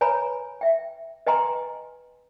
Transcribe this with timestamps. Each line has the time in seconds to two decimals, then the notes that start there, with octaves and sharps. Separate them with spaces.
0.01 B4 C#5 G#5 A#5 B5
0.61 E5 G5
1.27 B4 D#5 G5 G#5 A#5 C6